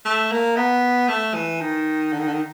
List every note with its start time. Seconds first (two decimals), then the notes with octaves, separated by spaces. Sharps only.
0.05 A3
0.32 A#3
0.56 B3
1.09 A3
1.34 E3
1.61 D#3
2.13 D3
2.19 D#3
2.27 D3
2.33 D#3